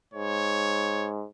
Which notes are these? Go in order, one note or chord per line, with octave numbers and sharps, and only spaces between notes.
G#2 C#5